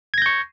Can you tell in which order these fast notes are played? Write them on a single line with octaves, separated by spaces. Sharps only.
G#6 A#6 G6 C#6